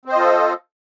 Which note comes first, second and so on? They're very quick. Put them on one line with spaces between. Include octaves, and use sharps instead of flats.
C4 C5 D#5 F4 A4